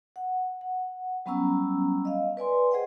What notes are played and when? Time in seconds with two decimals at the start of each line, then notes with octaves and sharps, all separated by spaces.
0.16 F#5
0.61 F#5
1.26 F#3 G3 B3 C#4 A#5 E6
2.05 D#5 F5
2.37 B4 D5 G#5 C6
2.71 G#4 C5 D#5 F#5 G5